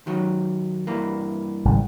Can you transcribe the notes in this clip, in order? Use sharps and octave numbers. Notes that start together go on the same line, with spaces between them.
D#3 F#3
G2 E3 A#3
G#1 C#3 G3